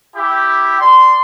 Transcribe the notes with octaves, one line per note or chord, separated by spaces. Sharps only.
E4 G4
D5 C6